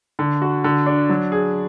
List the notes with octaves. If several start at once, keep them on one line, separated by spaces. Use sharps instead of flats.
D3
F#4
D3
D4
F#3
G#4